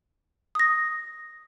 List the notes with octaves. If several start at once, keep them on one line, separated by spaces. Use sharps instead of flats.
D#6 A#6